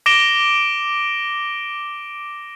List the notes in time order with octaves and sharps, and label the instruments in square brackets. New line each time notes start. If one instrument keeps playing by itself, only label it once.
[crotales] D6 A#6 D7 E7 G7